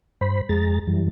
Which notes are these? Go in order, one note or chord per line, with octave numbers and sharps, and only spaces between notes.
G2 C5 B5
F2 G#3 G#4 A#5 A6
F#2 E3 G3